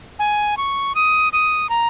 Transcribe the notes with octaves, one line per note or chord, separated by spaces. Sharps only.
G#5
C#6
D#6
D#6
A#5